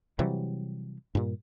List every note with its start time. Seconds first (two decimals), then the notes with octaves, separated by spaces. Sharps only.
0.19 C3 E3 F#3 G3
1.15 G2 A#2